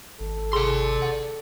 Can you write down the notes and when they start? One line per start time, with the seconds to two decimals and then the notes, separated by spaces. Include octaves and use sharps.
0.20 G#1 A4
0.53 G#4 D5 C6
1.02 F#5